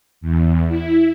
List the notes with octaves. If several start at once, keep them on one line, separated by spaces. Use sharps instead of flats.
E2
E4